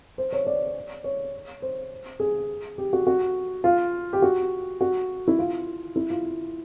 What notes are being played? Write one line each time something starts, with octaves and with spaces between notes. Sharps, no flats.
C5
C#5
D5
C#5
C5
G#4
G4
F#4
F#4
F4
G4
F#4
F#4
E4
F4
E4
F4